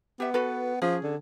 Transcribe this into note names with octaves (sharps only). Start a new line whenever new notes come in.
B3 G4 E5
F#4 A4 B4
F3 C#4 G#4
D3